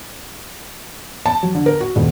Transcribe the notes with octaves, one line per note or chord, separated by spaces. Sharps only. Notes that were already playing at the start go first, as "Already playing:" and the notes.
A5
F#3
D3
A#4
F#4
D#1